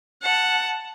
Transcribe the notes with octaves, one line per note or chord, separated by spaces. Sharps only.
F#5 A5